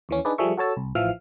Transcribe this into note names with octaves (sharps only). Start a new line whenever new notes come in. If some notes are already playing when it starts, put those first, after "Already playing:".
D#2 E3 C#4
D4 D#4 G#4 B4 D5
F3 G3 G#4 A4 E5 C#6
F#4 A4 C#5 A5 E6
C2
A1 E3 F3 E5 F5 F6